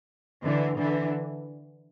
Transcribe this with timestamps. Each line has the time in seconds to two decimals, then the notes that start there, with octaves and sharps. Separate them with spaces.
0.44 D3 E3
0.79 D3 E3